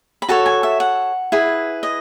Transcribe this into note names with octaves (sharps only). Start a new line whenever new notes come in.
B5
F#4 A4 C#5 A5
G#5
E5
F#5
E4 G#4 B4
D#5